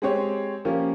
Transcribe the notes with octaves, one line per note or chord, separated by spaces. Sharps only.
G#3 C4 G4 C#5
F3 A#3 C#4 G4